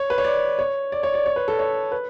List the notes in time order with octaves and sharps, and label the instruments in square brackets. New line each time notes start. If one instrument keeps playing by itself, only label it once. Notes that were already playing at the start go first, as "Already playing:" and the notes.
Already playing: [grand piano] C#5
B4
C#5
D5
C#5
D5
C#5
D5
C#5
B4
A4
C#5
B4